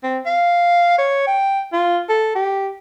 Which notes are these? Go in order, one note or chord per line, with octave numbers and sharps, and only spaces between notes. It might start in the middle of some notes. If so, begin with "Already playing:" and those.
C4
F5
C#5
G5
F4
A4
G4